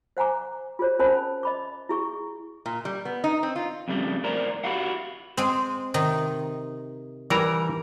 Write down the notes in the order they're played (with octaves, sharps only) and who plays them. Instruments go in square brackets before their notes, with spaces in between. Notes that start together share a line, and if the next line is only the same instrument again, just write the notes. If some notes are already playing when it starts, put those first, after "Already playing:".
[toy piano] C5 F#5 G#5 A#5 D6
F4 G#4 C5 C#5
C#4 A#4 C5 G#5 A5 B5
A5
D#5 B5 D6
E4 G#4 C#6
[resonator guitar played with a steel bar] A#2
G3
B3
D#4
C4
F4
[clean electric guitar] F2 C#3 G3 A3
A2 E4 A#4 C5 D5 A#5
E4 F#4 G4 F5 F#5
[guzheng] G#3 C4
C3 D#3 D#4
[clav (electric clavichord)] E3 A#4 A#5 [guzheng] G3